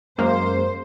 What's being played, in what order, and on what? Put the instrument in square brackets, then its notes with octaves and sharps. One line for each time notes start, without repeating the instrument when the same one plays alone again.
[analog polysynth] F#2 G#3 A#3 [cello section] C5